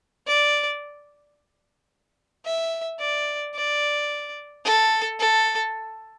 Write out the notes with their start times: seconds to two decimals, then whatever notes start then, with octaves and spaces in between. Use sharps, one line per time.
0.27 D5
2.45 E5
3.00 D5
3.55 D5
4.65 A4
5.19 A4